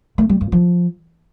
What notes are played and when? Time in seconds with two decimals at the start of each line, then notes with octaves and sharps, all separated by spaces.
0.18 A3
0.29 G3
0.41 G2
0.52 F3